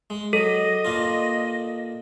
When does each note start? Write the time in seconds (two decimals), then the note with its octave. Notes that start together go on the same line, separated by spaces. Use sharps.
0.10 G#3
0.33 F#3 A4 D#5
0.85 A#2 D4 F4